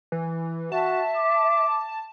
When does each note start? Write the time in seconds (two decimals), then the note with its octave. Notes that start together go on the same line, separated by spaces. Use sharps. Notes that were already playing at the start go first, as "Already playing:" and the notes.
0.12 E3
0.72 F#4 E5 A5
1.17 D6